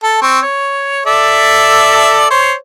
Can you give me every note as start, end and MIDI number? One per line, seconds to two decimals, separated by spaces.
0.03 0.21 69
0.21 0.40 60
0.21 0.40 85
0.42 1.02 73
1.06 2.28 69
1.06 2.28 74
1.06 2.28 76
2.30 2.53 72
2.30 2.53 73